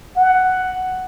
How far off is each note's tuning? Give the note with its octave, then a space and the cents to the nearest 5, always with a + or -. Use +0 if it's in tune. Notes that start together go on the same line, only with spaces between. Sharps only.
F#5 +5